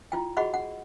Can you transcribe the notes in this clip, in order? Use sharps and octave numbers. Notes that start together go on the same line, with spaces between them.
E4 F4 G5
F#4 G#4 D#5 F#5 B5 C#6
F#5